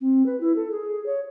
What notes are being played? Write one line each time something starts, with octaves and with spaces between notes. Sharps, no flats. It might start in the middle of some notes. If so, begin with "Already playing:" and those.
C4
B4
E4
A4
G#4
C#5